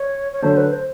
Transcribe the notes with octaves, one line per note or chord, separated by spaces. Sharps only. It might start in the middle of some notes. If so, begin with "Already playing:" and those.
Already playing: C#5
C#5
D3 F#3 A3 C#4 C5
B4
C5